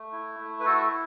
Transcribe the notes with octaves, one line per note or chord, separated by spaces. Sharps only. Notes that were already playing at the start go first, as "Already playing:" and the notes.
Already playing: A3
E4
A3
B4
E4 F#4 A4